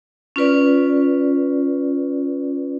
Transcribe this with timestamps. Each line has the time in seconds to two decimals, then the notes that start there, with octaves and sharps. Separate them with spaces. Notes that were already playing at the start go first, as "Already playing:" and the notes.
0.36 C#4 F4 B4 D5